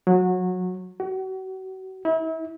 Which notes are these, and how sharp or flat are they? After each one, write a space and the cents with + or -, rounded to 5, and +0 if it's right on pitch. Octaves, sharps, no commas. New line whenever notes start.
F#3 -20
F#4 +35
E4 -35